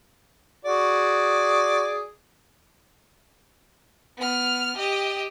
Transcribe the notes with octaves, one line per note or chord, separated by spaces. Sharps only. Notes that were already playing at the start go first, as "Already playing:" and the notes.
F#4 G#4 D5
B3 F6
G4 D#5